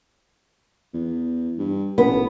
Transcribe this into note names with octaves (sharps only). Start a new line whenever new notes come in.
E2
G2
A1 B3